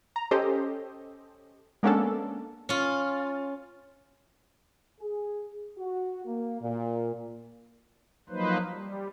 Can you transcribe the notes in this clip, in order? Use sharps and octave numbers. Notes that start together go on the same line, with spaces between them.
A#5
C#4 G4 A4 C5 D#5
G#3 A#3 B3 C#4 D4 A4
C#4 F4
G#4
F#4
A#3
A#2
F3 F#3 A#3 D#4 B4 C5
G3